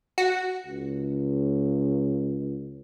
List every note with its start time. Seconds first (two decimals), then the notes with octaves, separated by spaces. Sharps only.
0.18 F#4
0.66 C#2